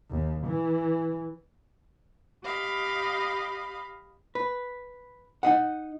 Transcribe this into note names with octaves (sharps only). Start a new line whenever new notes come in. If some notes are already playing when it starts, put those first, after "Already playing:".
D#2
E3
G4 D#5 F5 B5
B4
D#4 D#5 F#5